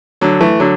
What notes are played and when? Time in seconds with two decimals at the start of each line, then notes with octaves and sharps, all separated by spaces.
0.21 D3 F#3
0.41 E3 A3
0.60 D3 F#3